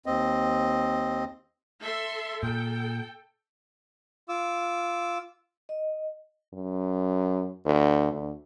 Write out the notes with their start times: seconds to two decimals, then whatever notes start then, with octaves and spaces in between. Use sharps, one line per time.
0.06 D#2 C4 D#5
1.80 A4 E5 C6
2.43 A#2 A4 G5
4.29 F4 D6 E6
5.69 D#5
6.54 F#2
7.65 D2
8.12 D2